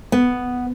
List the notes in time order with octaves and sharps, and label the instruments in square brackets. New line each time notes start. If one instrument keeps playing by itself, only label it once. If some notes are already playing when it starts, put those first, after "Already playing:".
[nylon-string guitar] B3